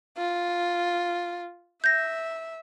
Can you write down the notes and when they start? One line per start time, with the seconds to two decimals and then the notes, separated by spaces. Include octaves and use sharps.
0.18 F4
1.84 E5 G6 A#6